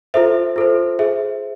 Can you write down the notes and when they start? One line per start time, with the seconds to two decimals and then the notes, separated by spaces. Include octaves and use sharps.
0.14 F4 A4 C5 E5
0.56 F4 A4 C5
0.99 G#4 C5 E5